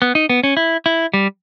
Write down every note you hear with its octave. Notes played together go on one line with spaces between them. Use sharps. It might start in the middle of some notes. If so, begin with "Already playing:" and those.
B3
D#4
B3
C#4
E4
E4
G3